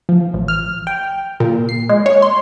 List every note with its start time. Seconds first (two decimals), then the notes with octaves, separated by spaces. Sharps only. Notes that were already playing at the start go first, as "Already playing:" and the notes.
0.09 F3
0.34 A1
0.48 F6
0.87 G5
1.40 A#2
1.69 C7
1.89 G#3
2.06 C#5
2.22 C6